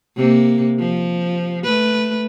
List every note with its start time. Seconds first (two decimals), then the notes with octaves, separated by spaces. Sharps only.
0.16 C3 A#3
0.79 F3
1.64 A3 B4